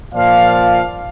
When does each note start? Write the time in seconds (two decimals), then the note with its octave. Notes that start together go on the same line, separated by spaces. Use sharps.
0.14 A#2 F3 D5 F5